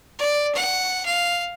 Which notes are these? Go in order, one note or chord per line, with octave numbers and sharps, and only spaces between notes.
D5
F#5
F5